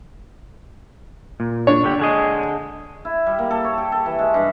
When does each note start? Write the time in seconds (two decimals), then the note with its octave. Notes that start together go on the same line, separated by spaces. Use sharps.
1.40 A#2
1.67 D4 C#5
1.84 D3 G4
1.99 D3 G#4 D#5
3.05 E4
3.26 G3
3.39 A#3
3.51 A4
3.64 C#5
3.78 G4
3.92 A4
4.06 E3
4.19 G#3
4.34 G2